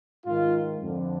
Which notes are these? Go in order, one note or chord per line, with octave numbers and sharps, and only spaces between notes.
G#2 D#3 F4
F2 D3